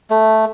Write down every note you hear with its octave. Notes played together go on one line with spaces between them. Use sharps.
A3